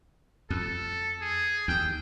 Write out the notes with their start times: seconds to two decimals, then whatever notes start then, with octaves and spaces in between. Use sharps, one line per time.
0.50 F2 A4
1.21 G#4
1.68 D#2 G5